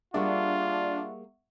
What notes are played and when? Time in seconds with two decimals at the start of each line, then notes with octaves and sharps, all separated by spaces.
0.14 G3 A#3 D4 F4 G#4 E5 F#5 C#6